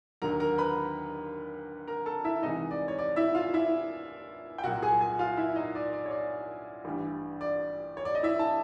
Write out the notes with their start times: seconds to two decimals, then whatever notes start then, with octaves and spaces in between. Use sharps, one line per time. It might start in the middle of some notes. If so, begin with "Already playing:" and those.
0.22 D#2 D3 F#3 A#4 A#5
0.40 A#4 A#5
0.58 B4 B5
1.87 A#4 A#5
2.06 A4 A5
2.24 E4 E5
2.43 C2 C3 E3 G#3 D#4 D#5
2.71 D5
2.88 C#5
2.99 D5
3.16 E4 E5
3.35 F4 F5
3.54 E4 E5
4.58 G5
4.63 C2 A#2 F#3 F#4 F#5
4.82 G#4 G#5
5.01 G#4 G#5
5.19 F4 F5
5.37 E4 E5
5.56 D#4 D#5
5.75 D5
5.93 D5
6.06 C#5
6.11 D5
6.85 A1 G2 E3 G3
7.41 D5
7.97 C#5
8.05 D5
8.15 D#5
8.23 E4 E5
8.39 A5